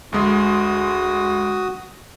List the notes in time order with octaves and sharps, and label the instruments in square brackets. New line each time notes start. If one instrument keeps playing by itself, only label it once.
[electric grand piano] D2 G#3 C6 [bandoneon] F#4 D#6